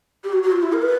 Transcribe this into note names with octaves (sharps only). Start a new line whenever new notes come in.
G4
F#4
F#4
F4
E4
A#4
B4